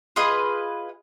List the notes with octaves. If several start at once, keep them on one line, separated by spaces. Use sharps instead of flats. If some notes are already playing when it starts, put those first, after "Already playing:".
F4 G#4 B4 D#5